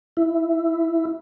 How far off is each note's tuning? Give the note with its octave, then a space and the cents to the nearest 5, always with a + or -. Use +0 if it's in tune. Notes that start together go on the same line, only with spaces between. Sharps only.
E4 +5